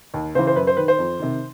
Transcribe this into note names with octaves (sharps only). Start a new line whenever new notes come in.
D#2
C#3 E3 C5
C5
F#2 B4
C5
D#3 B4
C5
F2
C3 D#3